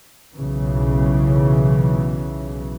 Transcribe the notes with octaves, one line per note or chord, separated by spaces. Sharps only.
B1 C#3 E3